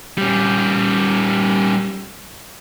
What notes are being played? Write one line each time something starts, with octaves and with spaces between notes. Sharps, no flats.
G3 C#4